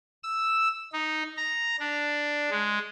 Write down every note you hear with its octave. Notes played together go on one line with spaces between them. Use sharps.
E6
D#4
A#5
D4
G#3